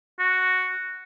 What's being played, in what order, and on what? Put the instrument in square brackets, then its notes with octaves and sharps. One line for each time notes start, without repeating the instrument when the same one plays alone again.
[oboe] F#4